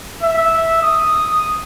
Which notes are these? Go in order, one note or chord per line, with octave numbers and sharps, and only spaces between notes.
E5
D#6